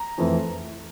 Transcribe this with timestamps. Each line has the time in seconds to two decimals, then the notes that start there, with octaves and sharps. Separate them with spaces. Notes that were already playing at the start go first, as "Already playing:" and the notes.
Already playing: A#5
0.18 F2 E3 A3